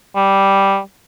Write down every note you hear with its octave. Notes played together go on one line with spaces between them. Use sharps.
G3